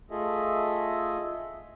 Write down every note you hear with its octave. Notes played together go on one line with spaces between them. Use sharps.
A3 F4 G#4 A4 D#5 E5